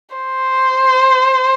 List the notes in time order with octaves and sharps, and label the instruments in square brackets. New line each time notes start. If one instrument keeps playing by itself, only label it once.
[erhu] C5